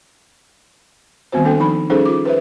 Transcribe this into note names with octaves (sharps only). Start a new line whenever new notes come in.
D#3 G3 B3 C4 F#4 C5
A#3 D4 A4 G5
F3 D#4 B5
G3 C#4 D#4 G#4 A4 C5
F4 D6
B4 C5 E5